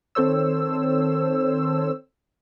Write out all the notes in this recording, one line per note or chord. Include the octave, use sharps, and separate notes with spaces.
D#3 C4 A4 C5 C#5 E6